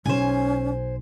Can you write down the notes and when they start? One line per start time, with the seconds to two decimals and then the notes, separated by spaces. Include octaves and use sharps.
0.06 B1 C#4 C5 G#5